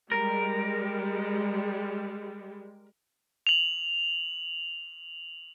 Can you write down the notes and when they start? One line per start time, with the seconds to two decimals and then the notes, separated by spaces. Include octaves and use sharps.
0.12 G3 G#3 A#4
3.47 F7 F#7